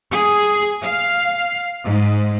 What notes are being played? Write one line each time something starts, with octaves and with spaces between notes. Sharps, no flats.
G#4
F5
G#2